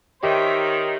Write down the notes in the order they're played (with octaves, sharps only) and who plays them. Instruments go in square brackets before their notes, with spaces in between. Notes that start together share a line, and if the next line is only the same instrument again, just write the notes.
[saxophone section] D#3 [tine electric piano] G4 [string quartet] C5 C#5 E5